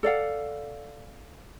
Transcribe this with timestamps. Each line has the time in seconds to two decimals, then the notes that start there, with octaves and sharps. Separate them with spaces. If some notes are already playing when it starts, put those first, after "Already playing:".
0.03 A4 D5 F5 F#5